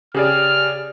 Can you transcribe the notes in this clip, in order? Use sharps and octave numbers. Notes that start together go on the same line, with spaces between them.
C#3 G4 G#4 D5 F6